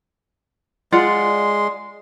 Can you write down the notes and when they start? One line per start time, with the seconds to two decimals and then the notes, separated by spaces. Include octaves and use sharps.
0.92 G#3 F4 D5 F#5 C6